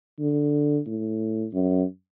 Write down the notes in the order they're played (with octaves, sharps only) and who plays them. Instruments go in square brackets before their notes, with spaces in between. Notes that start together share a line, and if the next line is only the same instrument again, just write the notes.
[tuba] D3
A2
F#2